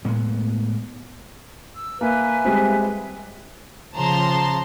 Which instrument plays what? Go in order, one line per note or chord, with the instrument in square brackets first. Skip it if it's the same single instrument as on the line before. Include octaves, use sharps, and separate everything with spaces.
[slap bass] A2 G#3 A#3 B3
[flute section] E6
[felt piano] A#3 [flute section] B4 E5 G#5
[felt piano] G3 G#3 C4
[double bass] C#3 F3 [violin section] A5 A#5 C6